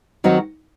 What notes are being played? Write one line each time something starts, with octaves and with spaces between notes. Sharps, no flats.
D#3 F#3 C4 D#4 F#4